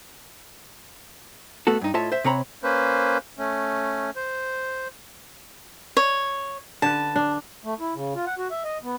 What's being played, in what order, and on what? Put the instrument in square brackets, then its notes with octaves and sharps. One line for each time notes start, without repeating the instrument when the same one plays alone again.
[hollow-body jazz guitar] A3 B3 F#4 A4
G2 D#4
A2 F4 C#5 D#5 E5 A5
C5 E5
C3 C4 C#5 A#5 B5
[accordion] A#3 C#4 B4 C5
A3 C#4
C5
[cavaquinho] C#5
[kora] D3 B4 [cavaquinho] A5
[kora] D4
[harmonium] A3
E4
C#3
F4
F#5
F#4
E5
D#5
B3